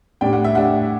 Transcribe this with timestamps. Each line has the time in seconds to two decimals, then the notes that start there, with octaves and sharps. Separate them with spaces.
0.21 A2 G3 D4 G5
0.33 F#5
0.44 E5
0.55 A2 G3 D4 F#5